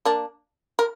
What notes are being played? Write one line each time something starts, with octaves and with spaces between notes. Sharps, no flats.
A#3 D4
A#4